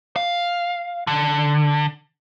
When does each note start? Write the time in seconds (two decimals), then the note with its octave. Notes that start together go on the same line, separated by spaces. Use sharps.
0.16 F5
1.07 D3